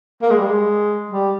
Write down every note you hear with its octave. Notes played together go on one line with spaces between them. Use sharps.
A#3
G#3
G3
G#3
G3